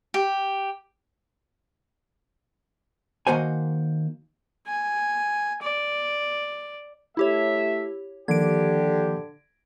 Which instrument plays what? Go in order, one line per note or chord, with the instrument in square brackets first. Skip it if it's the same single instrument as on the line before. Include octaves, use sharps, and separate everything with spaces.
[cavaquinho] G4
[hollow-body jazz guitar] D#3 A#3 F#4 C5 G#5
[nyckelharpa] G#5
D5
[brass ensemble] A3 E5 [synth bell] E4 G4 C#5
[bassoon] D3 [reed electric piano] D#3 F3 A#3 [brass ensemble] G4 [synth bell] G#6 D7